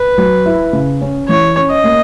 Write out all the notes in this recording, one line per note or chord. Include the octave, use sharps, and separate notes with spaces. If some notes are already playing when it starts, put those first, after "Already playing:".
Already playing: B4
F#3
E4
C#3
C#4
E3 C#5
C#4
D#5
A#3